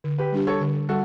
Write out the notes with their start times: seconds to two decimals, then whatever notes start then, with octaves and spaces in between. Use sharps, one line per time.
0.04 D3
0.18 G4 B4
0.32 G3 D4 G4
0.47 A4 C#5
0.61 D3
0.89 G3 F#4 A4